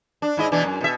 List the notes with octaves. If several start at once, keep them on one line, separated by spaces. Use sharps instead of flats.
D4
G#2 E4 D#5
B2 E3 D4
F#2
B2 E5